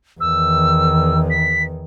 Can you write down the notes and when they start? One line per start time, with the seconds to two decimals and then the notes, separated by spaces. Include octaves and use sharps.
0.20 E2 D#3 E6
1.30 B6